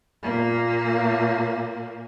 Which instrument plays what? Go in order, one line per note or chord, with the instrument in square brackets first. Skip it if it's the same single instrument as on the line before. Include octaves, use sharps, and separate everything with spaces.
[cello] A#2 A#3